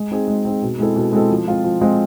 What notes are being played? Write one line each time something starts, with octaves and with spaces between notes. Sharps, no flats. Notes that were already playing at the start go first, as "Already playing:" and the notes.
Already playing: G#3
C4 D#4 G#4
G#3
C4 D#4 G#4
B2
G#3 C4 E4 A4
B2
G#3 C4 E4 A4
F3
G#3 C4 F4
F3
G#3 C4 F4